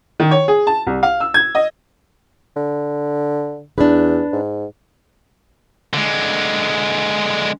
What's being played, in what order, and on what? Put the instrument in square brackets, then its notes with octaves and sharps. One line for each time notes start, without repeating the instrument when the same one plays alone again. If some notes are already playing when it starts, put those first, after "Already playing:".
[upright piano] D#3
C#5
G#4
A5
C2
F5
E6
G#6
D#5
[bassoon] D3
[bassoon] E2 [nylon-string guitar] D4 B4
[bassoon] G#2
[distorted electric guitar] D3 G#3